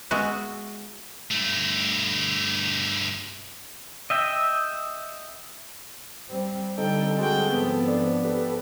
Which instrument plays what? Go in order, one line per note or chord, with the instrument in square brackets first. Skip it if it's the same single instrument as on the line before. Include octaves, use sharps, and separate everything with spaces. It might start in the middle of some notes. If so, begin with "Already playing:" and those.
[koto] G#3 B3 F#4 E5
[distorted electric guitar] G2 A3
[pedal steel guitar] D#5 E5 G5
[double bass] G3 C4
[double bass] D3 G3 [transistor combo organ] C4 A4 [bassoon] D#4 [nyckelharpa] G5
[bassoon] G#3 [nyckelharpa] F#4 G5
[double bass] G#2 F3 [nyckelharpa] B3
[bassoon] D4
[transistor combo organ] G4 A4 B4